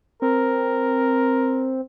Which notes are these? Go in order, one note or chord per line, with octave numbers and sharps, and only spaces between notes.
C4 A#4